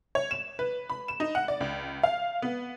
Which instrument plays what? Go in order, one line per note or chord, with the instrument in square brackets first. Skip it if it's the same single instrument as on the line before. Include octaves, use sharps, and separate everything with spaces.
[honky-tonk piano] C#5
E7
B4
B5
E7
D#4
F#5
D5
C#2
F5
B3